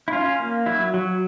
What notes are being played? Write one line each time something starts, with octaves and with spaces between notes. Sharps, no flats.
E4
C#4 F4
A#3
F#3 E4
F#3